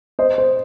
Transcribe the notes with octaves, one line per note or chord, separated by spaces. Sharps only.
C5 D#5
C5